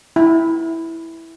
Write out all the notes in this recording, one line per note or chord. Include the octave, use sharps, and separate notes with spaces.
E4